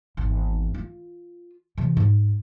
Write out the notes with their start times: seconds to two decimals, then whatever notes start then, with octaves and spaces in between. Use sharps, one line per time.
0.17 G#1 E2
0.74 F4
1.78 C3 E3
1.97 G#2